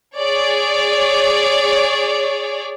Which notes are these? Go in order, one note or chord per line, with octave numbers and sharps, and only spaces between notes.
G#4 C#5 D5